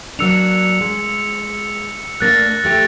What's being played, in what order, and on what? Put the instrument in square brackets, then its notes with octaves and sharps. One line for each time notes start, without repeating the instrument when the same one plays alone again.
[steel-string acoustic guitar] F#3 A#3 D4 [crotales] E6 C#7 F7
[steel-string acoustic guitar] G#3
[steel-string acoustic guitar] A3 A#3 D4 [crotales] F#6 A6 A#6
[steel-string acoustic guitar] F3 A3 G4